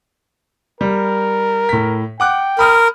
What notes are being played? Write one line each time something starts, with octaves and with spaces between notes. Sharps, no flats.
G3 A#4
A2 B6
F#5 G5 D6 F#6
A#4 B5 D#6 F6